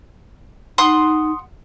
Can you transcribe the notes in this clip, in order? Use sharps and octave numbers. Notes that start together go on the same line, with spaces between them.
D#4 F#5 C6 D#6